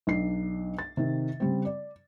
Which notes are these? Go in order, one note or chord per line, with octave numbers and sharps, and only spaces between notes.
B1 D4 C7
A6
C3 D#3
C#3 G3 C4
D5